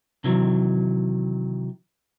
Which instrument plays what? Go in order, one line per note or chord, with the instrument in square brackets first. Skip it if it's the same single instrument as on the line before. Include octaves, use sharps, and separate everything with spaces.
[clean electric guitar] C3 D#3 E3 F#3